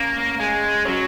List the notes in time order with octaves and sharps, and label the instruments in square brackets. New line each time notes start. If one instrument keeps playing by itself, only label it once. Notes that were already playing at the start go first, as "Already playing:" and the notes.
Already playing: [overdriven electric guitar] A#3 [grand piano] C#4
[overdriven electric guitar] G#3
[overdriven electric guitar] F#3 [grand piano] C#4